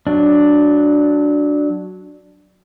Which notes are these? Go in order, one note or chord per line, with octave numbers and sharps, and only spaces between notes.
F#3 D4